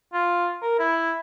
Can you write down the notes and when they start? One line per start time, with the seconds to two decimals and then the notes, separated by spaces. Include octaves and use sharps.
0.13 F4
0.62 A#4
0.79 E4